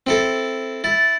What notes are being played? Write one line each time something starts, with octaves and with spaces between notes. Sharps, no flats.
C4 E4 A4
E4 A6